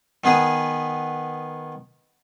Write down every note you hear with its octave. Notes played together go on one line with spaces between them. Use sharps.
D#3 B3 G#4 B4 D#6